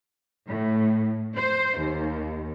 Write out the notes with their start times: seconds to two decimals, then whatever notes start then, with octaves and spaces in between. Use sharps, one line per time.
0.47 A2
1.36 C5
1.79 D#2